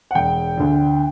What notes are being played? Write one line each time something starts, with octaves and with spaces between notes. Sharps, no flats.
F#5
E1 G5
D2 D3